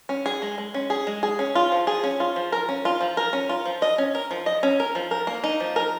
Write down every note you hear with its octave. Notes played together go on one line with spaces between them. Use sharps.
C#4
G#4
G#3
G#3
C#4
G#4
G#3
G#4
C#4
F4
F3
G#4
C#4
F4
F3
A#4
C#4
F4
F3
A#4
C#4
F4
F3
D#5
C#4
A#4
F3
D#5
C#4
A#4
F3
A#4
A#3
D#4
F3
A#4